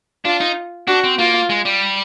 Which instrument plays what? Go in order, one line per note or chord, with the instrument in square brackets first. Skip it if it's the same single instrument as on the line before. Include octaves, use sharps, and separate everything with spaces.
[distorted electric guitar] D4 [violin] F4
[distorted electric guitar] D#4
[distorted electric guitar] D4 [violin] F#4
[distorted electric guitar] C4
[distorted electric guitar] A#3 [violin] F4
[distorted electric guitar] G#3
G3